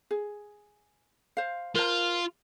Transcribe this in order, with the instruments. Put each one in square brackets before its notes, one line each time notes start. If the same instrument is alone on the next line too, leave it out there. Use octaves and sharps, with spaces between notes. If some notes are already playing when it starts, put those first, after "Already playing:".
[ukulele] G#4
C5 F5
[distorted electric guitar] F4 [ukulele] A#4 C5 A5